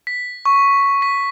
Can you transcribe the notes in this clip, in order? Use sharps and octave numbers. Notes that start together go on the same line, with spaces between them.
B6
C#6
B6